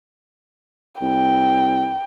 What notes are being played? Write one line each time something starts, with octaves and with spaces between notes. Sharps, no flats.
C2 G5